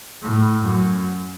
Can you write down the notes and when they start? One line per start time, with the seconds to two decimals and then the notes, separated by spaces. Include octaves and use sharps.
0.22 A2
0.65 F#2